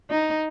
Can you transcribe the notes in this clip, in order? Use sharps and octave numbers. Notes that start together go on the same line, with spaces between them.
D#4